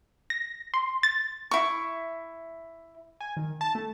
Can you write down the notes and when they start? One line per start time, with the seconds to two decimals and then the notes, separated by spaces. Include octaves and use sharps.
0.30 A#6
0.74 C6
1.03 A6
1.51 E4 C#6
3.21 G#5
3.37 D#3
3.61 A5
3.75 A3